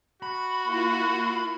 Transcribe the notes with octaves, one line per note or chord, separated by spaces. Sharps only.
F#4 B5
A#3 E4 F4